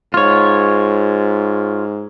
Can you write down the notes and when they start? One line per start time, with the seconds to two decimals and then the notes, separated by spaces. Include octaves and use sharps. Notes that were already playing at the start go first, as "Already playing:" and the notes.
0.14 G#2 F4 C#5